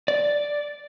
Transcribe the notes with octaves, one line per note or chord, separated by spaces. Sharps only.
D5